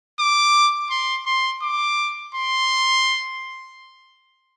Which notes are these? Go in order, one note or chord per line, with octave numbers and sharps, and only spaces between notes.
D6
C6
C6
D6
C6